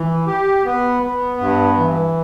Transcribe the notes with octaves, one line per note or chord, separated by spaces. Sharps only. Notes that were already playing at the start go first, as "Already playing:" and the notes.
Already playing: E3
G4
B3
B3
G2
E3